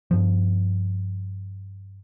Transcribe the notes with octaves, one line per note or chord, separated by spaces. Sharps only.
G2 F3